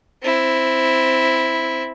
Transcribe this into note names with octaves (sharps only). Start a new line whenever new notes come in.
C4 E4